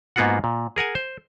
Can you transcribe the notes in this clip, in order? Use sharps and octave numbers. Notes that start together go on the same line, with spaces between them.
G#2 A#3 B3 F4 F#4 F#5
A#2
G#4 A#4 F#5 G#5
C5